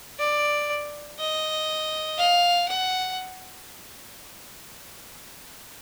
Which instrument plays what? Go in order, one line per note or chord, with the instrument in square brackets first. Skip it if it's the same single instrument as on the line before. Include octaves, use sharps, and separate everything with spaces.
[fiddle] D5
D#5
F5
F#5